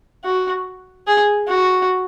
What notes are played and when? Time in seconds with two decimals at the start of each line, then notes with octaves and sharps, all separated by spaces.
0.25 F#4
1.07 G#4
1.48 F#4